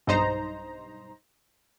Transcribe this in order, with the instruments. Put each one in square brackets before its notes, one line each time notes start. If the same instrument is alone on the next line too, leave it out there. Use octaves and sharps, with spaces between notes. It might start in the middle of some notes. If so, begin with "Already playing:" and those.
[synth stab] B1 G2 D#4 C5 A#5